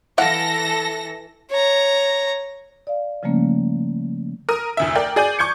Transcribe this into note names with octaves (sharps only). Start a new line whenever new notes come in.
E3 E4 A4 F5 F#5 A#6
C#5 A#5
D5 F5
C#3 F3 G3 A3 A#3 C#4
A#4 D#6
F1 D2 E5
A#4 D5 G5
G#4 D5 G#5 G6
C#6 D6 G6 G#6 C#7